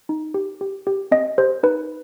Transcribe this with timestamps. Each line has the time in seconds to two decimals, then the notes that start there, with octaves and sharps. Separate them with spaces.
0.09 D#4
0.34 G4
0.61 G4
0.87 G4
1.11 C4 D#5
1.38 G4 C5
1.63 D#4 B4